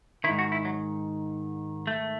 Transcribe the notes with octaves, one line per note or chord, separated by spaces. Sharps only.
G#2 D#3 E4
F#4
E4
F#3
A3